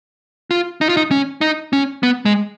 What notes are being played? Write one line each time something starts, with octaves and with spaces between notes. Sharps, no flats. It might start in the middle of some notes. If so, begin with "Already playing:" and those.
F4
D#4
F4
D#4
C#4
D#4
C#4
B3
G#3